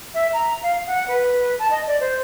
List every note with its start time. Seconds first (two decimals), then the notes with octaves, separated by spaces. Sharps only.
0.14 E5
0.33 A#5
0.62 F5
0.87 F#5
1.08 B4
1.59 A5
1.71 D#5
1.87 D5
2.00 C5